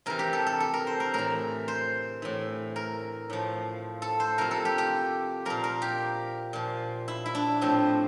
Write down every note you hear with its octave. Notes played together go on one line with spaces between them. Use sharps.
C3 E3 A#4
G4
A4
A4
A4
A#4
C5
A#4
A2 E3 A#4
C5
A2 E3
A#4
A2 F3
A4
C5
C3 F3 A#4
A4
G4
G4
A#2 F3 A#4
A#4
G4
A#2 F3
E4
E4
D4
A2 F3 C4